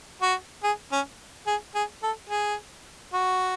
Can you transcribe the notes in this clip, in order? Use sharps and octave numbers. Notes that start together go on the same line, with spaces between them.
F#4
G#4
C#4
G#4
G#4
A4
G#4
F#4